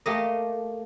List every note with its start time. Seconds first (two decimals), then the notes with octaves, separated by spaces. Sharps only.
0.06 A3 A#3 G4 A#4 D#5